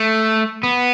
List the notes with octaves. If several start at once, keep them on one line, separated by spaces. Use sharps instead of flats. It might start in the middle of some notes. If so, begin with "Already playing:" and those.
Already playing: A3
B3